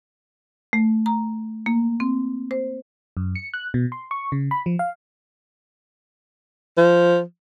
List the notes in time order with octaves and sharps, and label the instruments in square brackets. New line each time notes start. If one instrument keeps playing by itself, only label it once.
[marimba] A3
A#5
A#3
C4
C5
[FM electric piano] F#2
C#7
F#6
B2
C6
C#6
C#3
B5
F3
F5
[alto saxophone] F3